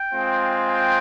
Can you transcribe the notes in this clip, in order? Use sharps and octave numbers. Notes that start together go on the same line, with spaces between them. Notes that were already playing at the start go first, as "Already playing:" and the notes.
Already playing: G5
G#3 C4 F4
G5